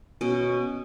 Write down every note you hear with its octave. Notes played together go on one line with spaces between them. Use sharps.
B2 C#4